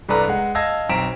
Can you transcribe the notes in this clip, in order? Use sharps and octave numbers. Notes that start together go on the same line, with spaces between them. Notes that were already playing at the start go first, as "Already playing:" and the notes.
C2 G2 D4 A4 B4 A#5
G#3 F#5
D#5 F5 A5 E6 G#6 A#6
B1 C4 A#5 B6 D7 E7